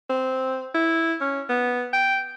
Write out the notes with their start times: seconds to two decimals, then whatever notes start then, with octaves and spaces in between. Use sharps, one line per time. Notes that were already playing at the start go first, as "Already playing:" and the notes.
0.10 C4
0.75 E4
1.21 C#4
1.49 B3
1.93 G5